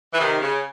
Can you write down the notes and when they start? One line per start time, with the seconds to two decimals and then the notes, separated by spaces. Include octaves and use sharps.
0.13 E3
0.19 C3 D#3
0.42 C#3